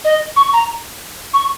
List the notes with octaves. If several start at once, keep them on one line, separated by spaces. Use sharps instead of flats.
D#5
C#6
A#5
C#6